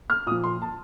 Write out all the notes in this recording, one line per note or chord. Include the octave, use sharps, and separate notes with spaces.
F6
A#2 F3 D#6
C6
A5